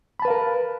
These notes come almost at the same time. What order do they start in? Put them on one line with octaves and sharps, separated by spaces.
B5 A5 B4 F5 A#4